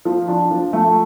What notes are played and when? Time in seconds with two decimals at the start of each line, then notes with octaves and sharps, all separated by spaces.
0.05 F3
0.28 D4
0.51 F3
0.73 A3